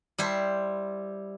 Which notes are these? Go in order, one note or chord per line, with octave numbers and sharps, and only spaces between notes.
G3 E4 C5